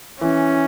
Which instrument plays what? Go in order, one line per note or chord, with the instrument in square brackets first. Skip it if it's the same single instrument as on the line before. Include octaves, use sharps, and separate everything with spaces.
[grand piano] E3 [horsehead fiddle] C#4